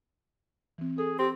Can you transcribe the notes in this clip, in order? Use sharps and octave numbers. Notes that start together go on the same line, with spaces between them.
E3 C4
G#4 A4
C4 G4